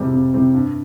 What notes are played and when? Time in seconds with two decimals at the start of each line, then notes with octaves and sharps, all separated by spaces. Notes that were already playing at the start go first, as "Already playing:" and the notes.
Already playing: F2 C3 G3 C4
0.13 F2
0.34 C3 G3 C4
0.54 G2